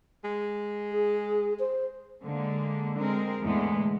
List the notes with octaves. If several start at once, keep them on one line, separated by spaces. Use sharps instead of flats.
G#3
G#4
C5
D3 G#3 A#3
G#3 C4 A#4
E2 A2 D3 E3 G#3 B3